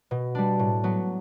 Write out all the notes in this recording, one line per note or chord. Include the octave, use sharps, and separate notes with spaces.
B2
G3 D4
A2
F#3 B3